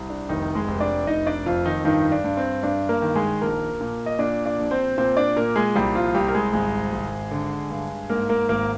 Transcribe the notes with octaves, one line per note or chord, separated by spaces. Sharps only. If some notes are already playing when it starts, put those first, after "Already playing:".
Already playing: C2
D4
F1 D#3 D#4
G#3 G#4
F1
D4 D5
F1 D#4 D#5
D4 D5
F2 F3 F4
D#3 D#4
G2 D#3 D#4
D4
G2
C4
G2 D4
A#3 A#4
D#3
G#3 G#4
A#1 A#3 A#4
A#2
D#5
A#2 D4 D5
D4 D5
A#1
C4 C5
A#2 C4 C5
D4 D5
A#2 A#3 A#4
G#3 G#4
C2 G3 G4
F3 F4
C2 G3 G4
A#4
G#3 G#4
G#1 G#3 G#4
G#1
D3
G2
G#2 A#3 A#4
A#3 A#4
G#1 A#3 A#4